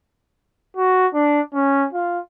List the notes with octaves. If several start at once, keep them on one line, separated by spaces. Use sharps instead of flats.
F#4
D4
C#4
F4